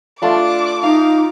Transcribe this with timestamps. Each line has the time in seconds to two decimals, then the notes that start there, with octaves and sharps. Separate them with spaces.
0.22 A3 D4 F4 C6 D6
0.83 D#4 F5 A#5